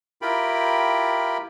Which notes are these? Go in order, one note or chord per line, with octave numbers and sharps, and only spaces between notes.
E4 F4 G4 A#4 G5 B5